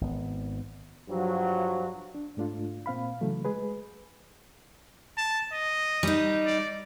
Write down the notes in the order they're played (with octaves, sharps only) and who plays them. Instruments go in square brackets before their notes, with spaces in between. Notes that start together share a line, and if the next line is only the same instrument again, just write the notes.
[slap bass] G#1 B3
[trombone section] G2 F3 F#3
[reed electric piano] D4
G#2 A3 D4 F4
A#2 C4 F5 B5
C#3 E3 F#3 A3
G#3 G#4 B4
[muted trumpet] A5
D#5
[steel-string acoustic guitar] G3 D#4
[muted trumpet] D5